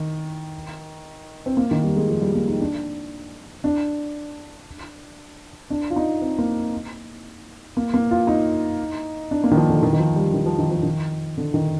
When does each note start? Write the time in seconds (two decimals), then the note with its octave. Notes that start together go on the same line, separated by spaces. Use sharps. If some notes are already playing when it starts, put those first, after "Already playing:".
Already playing: D#3
1.46 C4
1.57 A#3
1.71 D#3
1.84 G3
1.96 G#3
2.09 F3
2.21 G3
2.34 A#3
2.48 D#4
2.61 D4
3.64 D4
5.70 D4
5.90 F4
5.96 D#4
6.22 C4
6.39 A#3
7.77 A#3
7.94 A#3
8.11 F4
8.27 D#4
9.31 D4
9.44 A#3
9.51 D#3
9.57 F3
9.70 D3
9.83 D#3
9.93 D#3
9.99 F3
10.16 G3
10.33 D#3
10.46 F3
10.59 D#3
10.71 F3
10.83 D#3
11.37 D3
11.54 D#3